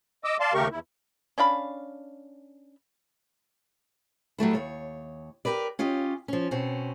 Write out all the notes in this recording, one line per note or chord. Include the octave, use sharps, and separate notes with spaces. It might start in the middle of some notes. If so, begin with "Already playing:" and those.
D#5 D6 E6
D5 F5 A5 C6
D#2 C#3 A3 G4 A#4 C#6
E2 E4
C#4 D4 F5 B5
F#3 G3 A3 E4
D#2 B2 C#5
G4 A#4 B4 D5
C#4 F4 G4 D#5
F3 C#4
B2 C4 C#4